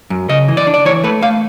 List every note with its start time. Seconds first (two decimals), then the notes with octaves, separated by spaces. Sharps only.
0.10 F#2
0.29 C#3 D#5
0.48 E3
0.57 D5
0.67 D4
0.74 D5
0.85 E3 C#5
1.04 A3 B4
1.23 A3 F5